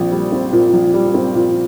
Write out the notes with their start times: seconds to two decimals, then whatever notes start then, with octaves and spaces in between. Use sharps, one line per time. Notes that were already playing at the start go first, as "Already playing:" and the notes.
Already playing: A#1 A#2 C4
0.12 G3
0.32 C4
0.53 A#2
0.73 A#1
0.94 G3
1.14 C4
1.35 A#2